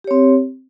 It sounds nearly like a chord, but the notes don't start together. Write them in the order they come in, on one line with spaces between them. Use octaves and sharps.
G4 C#5 C4